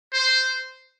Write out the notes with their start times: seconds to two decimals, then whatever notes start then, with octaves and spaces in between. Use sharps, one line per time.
0.14 C5